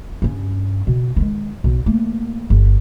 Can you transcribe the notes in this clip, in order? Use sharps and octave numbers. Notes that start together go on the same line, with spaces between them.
G2 C#4
B2
D#3 G#3
B1
A3 A#3
G1